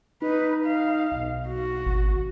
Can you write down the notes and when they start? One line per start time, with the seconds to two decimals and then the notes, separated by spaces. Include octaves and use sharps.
0.22 D#4 B4
0.65 F5
1.12 B1
1.47 F#4
1.86 G#1